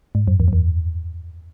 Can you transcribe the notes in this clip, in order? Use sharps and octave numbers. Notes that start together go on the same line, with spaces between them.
G#2
F#2
E2
F#2
E2